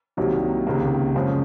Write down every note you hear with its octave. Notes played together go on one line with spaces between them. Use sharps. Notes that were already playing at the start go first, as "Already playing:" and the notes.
C2 C3 D#3 F#3 A#3
C#2 C3 D#3 A#3
F#2 C#3 F3 G#3